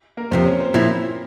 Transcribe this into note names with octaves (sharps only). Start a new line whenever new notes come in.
A#3 A#4
F2 C3 F3 C4 C5
C#4 C#5
C4 C5
A#2 F3 A#3 E4